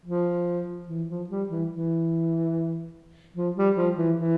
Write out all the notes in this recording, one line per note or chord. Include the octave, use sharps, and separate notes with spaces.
F3
E3
F3
G3
E3
E3
F3
G3
F3
E3
E3